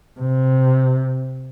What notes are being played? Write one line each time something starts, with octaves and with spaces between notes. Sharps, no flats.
C3